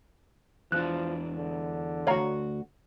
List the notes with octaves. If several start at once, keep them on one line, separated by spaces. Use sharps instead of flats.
E2 F3 D4 F#6
D3
D2 F#4 C#5 F5 A#5